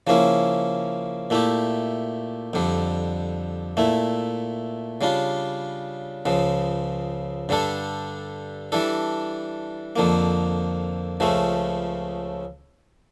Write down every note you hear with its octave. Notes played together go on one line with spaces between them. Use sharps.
C#3 F3 A#3 C#4 E4
A#2 A3 E4 G4
F2 D3 G3
A#2 A3 E4
C#3 G3 D4 F4
C#2 C#3 F3
G2 D3 G3 D4 A4
E3 G3 D4 A4
F2 D3 F3 A#3
C#2 C#3 F3 A3 C#4